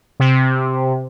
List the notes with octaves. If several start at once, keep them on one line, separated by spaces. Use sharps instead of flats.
C3